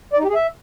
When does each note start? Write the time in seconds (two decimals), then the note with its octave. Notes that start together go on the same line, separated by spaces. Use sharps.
0.13 D5
0.19 D#4
0.24 G4
0.29 G#4
0.35 E5